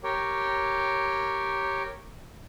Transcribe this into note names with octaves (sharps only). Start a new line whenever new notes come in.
G4 A#4 C#5 G5